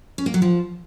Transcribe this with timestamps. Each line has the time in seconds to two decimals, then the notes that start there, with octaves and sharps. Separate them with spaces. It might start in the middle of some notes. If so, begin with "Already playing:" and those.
0.18 C#4
0.26 A#3
0.34 F#3
0.42 F3